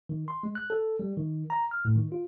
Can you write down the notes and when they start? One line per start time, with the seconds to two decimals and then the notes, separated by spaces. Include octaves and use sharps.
0.09 D#3
0.28 C6
0.43 G#3
0.55 F#6
0.70 A4
0.99 G3
1.17 D#3
1.50 A#5
1.71 F6
1.85 A2
1.96 D#3
2.12 F4